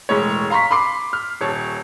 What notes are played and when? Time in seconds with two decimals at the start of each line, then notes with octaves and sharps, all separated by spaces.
0.09 E1 A2 G#3 C#5
0.50 F5 A#5 C6 C#6 B6
0.71 B5 C6 D6 C7
1.13 F6
1.41 D#1 C#5 A5